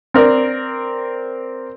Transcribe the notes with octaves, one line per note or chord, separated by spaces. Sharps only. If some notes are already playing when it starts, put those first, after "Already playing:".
C4 A#4 D5